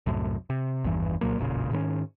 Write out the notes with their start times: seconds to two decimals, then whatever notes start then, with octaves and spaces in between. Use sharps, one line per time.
0.06 C2 F#2 A2
0.50 C3
0.84 G#1 E2 G2 E3
1.21 C2 A#2 F#3 A#3
1.38 E1 A1 A#2 C#3
1.72 G#2 D#3 B3 C#4